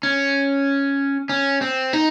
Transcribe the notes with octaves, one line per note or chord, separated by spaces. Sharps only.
C#4
C#4
C4
D#4